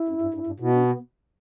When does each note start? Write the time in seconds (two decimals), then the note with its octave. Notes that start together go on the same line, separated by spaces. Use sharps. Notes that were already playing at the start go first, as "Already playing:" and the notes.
Already playing: E4
0.08 F#2
0.22 G2
0.34 G2
0.47 G2
0.60 B2 E4
0.73 D4
0.86 B3